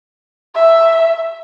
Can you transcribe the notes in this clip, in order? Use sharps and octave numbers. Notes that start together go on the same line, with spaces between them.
E5